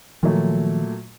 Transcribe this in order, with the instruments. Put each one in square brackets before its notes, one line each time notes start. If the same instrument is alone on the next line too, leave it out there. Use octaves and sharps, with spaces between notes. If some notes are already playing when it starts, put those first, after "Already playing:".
[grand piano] A#2 F#3 A3 [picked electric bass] D#3 F3